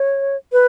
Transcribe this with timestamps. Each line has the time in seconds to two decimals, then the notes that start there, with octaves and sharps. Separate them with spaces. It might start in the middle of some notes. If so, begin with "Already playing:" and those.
Already playing: C#5
0.52 B4